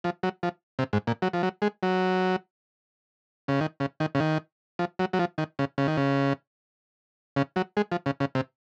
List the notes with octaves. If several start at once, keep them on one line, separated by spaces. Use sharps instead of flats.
F3
F#3
F3
C3
G#2
A#2
F#3
F3
F#3
G#3
F#3
C#3
D#3
C#3
D#3
C#3
D#3
F3
F#3
F#3
F3
D#3
C#3
C#3
D#3
C#3
C#3
F#3
G#3
F3
C#3
C#3
C3